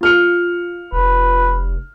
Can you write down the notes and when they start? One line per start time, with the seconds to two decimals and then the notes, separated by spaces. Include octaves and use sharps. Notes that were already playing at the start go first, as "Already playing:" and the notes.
0.01 F4 F6 C#7
0.92 F1 B4